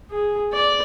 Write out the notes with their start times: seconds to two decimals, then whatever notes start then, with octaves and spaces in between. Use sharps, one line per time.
0.11 G#4
0.53 D5